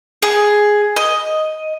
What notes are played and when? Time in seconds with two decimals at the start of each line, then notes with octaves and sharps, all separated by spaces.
0.22 G#4
0.96 D#5